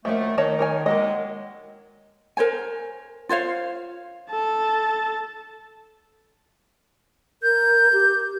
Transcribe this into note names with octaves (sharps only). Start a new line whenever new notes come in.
F#2 D#3 F3 A3 A#3
D#3 C#5 D#5 A5
A#4 C#5 G#5
D#3 F#3 G#3 A#3 G4 D#5
A#4 C5 C#5 G#5
F4 C5 C#5 F5
A4 A5
A#4 G6
G4